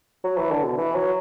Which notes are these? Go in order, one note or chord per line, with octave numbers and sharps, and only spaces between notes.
F#3
E3
D3
B2
E3
F#3